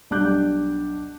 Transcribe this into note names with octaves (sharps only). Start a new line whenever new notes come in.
B1 G3 D4 D6 F#6 G6